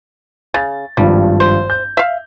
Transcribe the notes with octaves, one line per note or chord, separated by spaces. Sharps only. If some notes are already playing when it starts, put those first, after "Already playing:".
C#3 A6
G#1 G2 F3 G3
C5
G6
E5 F5